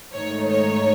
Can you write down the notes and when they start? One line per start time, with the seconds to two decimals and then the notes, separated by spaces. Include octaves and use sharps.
0.13 G#2 D#3 A3 D#4 C#5
0.49 C#5